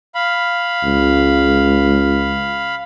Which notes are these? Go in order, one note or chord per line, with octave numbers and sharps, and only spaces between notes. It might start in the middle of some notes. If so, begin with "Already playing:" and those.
F5 B5
C#2